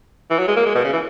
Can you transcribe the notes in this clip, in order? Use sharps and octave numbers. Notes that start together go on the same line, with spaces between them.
E3
F#3
G#3
A#3
G#3
B2
C#3
E3